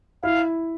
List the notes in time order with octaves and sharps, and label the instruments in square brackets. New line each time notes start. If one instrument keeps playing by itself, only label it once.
[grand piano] E4 [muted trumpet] F5